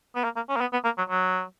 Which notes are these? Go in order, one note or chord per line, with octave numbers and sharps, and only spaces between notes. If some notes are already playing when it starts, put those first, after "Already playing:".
B3
A#3
A#3
C#4
A#3
B3
B3
A#3
F#3
F#3